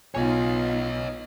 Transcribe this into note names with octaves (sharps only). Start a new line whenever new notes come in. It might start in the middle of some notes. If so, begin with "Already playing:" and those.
B1 B3 D#4 F4 C#5 D#5 G#5